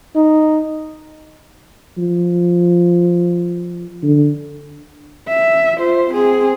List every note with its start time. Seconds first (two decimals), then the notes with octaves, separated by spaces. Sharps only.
0.16 D#4
1.98 F3
4.03 D3
5.28 E5
5.78 F4 C5
6.11 C4 G#4